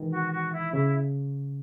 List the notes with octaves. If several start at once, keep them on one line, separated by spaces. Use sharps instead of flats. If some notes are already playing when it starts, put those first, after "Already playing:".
Already playing: D#3 E3 G#3
F#4
F#4
E4
C#3 E4